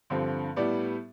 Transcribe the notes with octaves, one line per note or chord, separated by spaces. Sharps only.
G2 D3 F3 C4
A2 G3 B3 D5